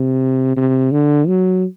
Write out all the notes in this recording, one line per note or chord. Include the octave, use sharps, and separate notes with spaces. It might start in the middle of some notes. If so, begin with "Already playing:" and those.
Already playing: C3
C3
D3
F#3